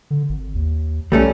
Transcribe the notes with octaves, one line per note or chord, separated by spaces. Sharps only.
D3
G#1
D#2
B1 G3 A3 C#4